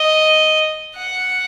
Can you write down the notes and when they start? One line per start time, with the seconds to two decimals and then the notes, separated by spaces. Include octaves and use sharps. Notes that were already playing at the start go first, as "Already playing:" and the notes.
Already playing: D#5
0.95 F#5